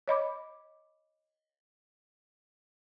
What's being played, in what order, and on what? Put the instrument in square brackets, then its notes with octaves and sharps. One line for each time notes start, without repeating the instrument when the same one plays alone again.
[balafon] C#5 D#5 B5 D6